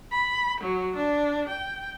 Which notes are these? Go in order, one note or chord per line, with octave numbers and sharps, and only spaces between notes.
B5
F#3
D4
G5